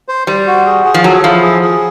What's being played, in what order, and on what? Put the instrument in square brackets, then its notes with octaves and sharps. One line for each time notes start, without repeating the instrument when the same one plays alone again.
[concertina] C5
[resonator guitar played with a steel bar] G3 [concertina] C5
[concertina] F#4
G#4
G#4
[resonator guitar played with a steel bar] F3
[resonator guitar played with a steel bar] F#3 [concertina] A4
[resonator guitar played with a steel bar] F3 [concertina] E4
[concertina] G#4
G#4